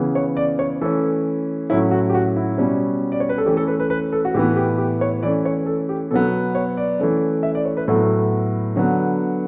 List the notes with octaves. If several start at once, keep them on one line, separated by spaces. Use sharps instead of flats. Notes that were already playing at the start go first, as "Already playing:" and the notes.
Already playing: C#3 E3 B3
C#5
D5
C#5
E3 A3 C#4 A4
A2 F#3 C#4 E4
F#4
G4
F#4
E4
B2 G3 C#4
D5
C#5
B4
A4
E3 A3 C#4 G4
A4
B4
B4
B4
A4
F#4
A2 E3 B3 G4
G4
G4
C#5
E3 A3 C#4 D5
C#5
A4
G4
B2 F#3 B3 A4
C#5
D5
E3 A3 C#4
E5
D5
C#5
B4
A2 F#3 B3 A4
D3 F#3 B3